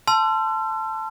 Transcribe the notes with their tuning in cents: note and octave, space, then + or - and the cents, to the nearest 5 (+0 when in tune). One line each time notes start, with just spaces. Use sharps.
A5 +0 C6 -15 E6 +45